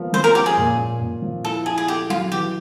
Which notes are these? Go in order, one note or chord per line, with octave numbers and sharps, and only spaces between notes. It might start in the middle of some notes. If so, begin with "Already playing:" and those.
Already playing: F3 A#3 B3
F3 C5
A#4
C#4 G4
G#4
A#2
A#2
A#2
F3
E4 A4
E4 G#4
G#4
G4 A4
F#3 F4
E3 G4